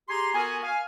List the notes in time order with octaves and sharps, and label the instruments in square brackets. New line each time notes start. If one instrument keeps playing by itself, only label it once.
[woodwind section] G4 G#4 G#5 A#5 C6
B3 F#4 A4 A#4 G#5
F5 G#5